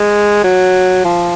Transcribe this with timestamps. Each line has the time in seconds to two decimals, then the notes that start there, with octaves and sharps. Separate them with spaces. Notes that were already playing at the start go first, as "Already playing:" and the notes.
Already playing: G#3
0.44 F#3
1.04 F3